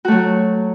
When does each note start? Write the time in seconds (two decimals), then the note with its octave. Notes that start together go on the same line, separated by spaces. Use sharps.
0.05 F#4
0.08 A3
0.11 F#3